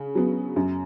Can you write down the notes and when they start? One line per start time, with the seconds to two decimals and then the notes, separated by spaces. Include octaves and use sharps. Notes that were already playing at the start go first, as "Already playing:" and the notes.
Already playing: C#3
0.15 F#3 B3
0.56 F#2